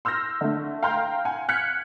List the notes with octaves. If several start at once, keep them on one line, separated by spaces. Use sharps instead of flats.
C6 E6 F6 G6 A#6
D3 A3
F5 G5 A#5 C6 F6 G6
F#5 G#5
F6 F#6 G#6 B6 C#7